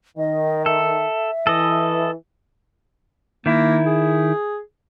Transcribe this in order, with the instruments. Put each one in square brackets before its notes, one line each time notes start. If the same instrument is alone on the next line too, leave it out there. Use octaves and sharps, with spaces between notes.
[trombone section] D#3 [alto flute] D#5
[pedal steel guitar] A4 [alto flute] E5
[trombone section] E3 [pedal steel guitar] A4 D#5
[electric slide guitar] D#3 E4 [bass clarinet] A#3
[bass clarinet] G#4